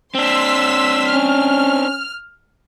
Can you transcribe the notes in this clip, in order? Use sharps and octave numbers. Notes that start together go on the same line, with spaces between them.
C4 D4 C6 E6 B6
C#4 F6